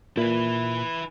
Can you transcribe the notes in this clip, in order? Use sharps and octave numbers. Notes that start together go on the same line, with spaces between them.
A#2 E4 B4